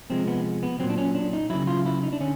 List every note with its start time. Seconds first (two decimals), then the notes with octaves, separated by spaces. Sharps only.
0.10 C3 F3 G#3 C4
0.28 B3
0.63 B3
0.80 A#2 F#3 C4
0.90 D4
0.98 C#4
1.15 D4
1.33 D#4
1.50 C#3 F#3 E4
1.67 F4
1.86 E4
2.03 D#4
2.13 D4
2.21 D3 C#4